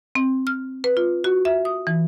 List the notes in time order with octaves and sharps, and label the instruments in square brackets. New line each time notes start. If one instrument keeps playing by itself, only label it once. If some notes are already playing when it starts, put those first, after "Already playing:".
[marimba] C4
F6
B4
F4
F#4
E5
D#6
E3